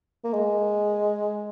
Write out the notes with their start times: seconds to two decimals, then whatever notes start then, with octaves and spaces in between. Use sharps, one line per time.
0.24 A#3
0.33 G#3